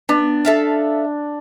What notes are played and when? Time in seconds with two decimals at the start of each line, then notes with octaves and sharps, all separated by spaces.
0.09 B3 D4
0.45 A4 E5 F5